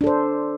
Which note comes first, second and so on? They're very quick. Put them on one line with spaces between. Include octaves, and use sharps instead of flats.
D4 A4 C5